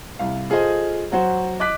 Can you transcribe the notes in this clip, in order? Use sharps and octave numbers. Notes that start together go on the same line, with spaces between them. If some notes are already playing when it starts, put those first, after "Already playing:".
C2 F5
F4 G#4 A4 C5 D#5
F#3 F#4 C5
D#5 D6 F#6 B6